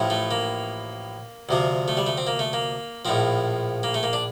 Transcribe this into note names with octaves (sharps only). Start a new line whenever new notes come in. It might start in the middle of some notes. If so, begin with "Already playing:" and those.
Already playing: A1 A2 F3
A3
A#3
D2 C3 F3
A3
G3
A3
C4
A#3
A3
A#3
A#1 A2 F3 C4
A#3
A3
A#3
D4